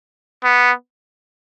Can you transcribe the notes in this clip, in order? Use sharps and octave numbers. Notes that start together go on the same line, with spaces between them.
B3